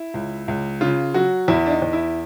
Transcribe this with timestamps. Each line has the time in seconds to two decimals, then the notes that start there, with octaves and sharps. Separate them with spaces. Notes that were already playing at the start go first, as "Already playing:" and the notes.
Already playing: E4
0.14 C#2
0.48 C#2
0.81 C#3 F4
1.14 F#3 F#4
1.48 E2 E4
1.66 D4
1.71 D#4
1.82 E2
1.93 E4